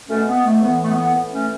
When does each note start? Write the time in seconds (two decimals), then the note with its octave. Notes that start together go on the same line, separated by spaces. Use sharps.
0.09 B2 A3 C#4
0.27 B3
0.45 A3
0.61 A2 E3 B3
0.83 A3
0.89 B3
1.02 B3
1.15 A2 E3
1.33 A3 C#4